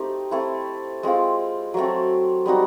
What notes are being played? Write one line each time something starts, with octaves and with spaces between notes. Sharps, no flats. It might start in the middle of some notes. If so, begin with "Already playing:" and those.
Already playing: A3 C4 D#4 G4
A3 C4 E4
G#3 C4 F4
F#3 A3 C4
G3 C4 D#4 F#4